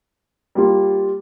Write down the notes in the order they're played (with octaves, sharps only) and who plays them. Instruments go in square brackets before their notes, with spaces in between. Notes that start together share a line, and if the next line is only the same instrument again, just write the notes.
[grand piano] G3 A#3 F4